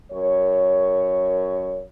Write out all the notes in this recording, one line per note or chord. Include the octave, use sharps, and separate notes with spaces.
F#2 A#4 C#5